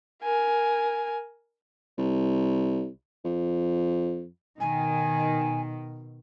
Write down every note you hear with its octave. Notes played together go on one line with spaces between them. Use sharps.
A#4 G#5
C2
F2
B2 D#3 G#5